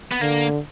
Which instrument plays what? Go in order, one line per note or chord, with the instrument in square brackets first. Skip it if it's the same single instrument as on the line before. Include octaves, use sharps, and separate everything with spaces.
[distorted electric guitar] B3
[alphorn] D3 [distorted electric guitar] A#3